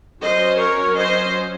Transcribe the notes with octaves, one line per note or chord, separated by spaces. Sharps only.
F#3 C#4 C5 D#5
A#4 C#5
C5 D#5